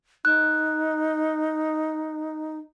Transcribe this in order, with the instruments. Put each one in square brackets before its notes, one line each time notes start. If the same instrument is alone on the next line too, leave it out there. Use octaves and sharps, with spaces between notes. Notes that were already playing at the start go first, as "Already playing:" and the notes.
[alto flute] D#4 [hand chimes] F#6